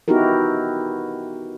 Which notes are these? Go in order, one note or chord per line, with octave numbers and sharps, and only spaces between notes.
B3 D#4 E4 F#4 G4 A#4